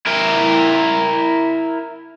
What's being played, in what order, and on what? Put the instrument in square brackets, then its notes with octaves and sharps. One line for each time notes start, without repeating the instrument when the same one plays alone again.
[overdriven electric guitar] E4 A#4